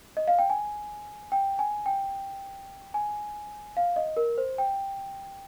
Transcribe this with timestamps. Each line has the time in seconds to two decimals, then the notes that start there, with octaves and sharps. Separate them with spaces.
0.17 D#5
0.28 F5
0.39 G5
0.50 G#5
1.32 G5
1.59 G#5
1.86 G5
2.94 G#5
3.77 F5
3.96 D#5
4.17 A#4
4.38 C5
4.58 G5